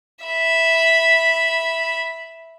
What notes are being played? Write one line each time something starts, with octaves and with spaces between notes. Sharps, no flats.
E5 B5